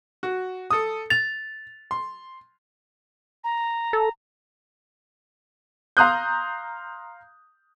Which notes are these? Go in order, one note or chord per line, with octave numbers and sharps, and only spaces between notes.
F#4
A4 D#6
A6 F7
C6
A#5
A4
F5 A#5 C6 D#6 F#6 G6